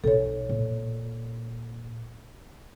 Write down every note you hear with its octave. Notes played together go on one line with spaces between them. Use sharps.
B1 A4 C#5
A#2